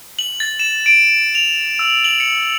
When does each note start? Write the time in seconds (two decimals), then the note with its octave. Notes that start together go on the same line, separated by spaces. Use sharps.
0.19 F#7
0.40 A6
0.60 E7
0.86 D7
1.35 F7
1.79 E6
2.05 F#7
2.20 C#7